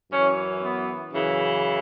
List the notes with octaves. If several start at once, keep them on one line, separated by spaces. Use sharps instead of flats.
F#2 E3 C#4
B3
F#2 C#3 E3